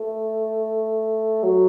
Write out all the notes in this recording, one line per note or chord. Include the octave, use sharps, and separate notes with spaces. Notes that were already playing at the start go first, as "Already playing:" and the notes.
Already playing: A3
F#3